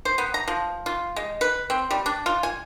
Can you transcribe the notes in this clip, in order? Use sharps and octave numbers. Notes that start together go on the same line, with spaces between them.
C5
B3
A#5
F3
F4
G#3
B4
C4
G3
D4
F4
G#5